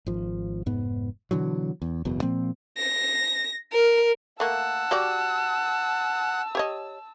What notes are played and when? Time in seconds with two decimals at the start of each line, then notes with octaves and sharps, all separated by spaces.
0.06 G#1 F3
0.66 F1 G#2 B3
1.31 B2 D3 E3 F#3
1.82 E2
2.05 F#1 E2 B2
2.22 A#2 F3 A#3 C4
2.77 A#6
3.73 A#4
4.40 A3 A#3 F#5 A5 E6
4.91 F#4 G4 D5
6.55 G4 C#5 D#5